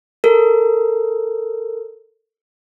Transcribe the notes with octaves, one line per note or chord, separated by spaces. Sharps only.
A4 A#4